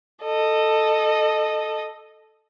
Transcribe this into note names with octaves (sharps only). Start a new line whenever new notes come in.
A4 D#5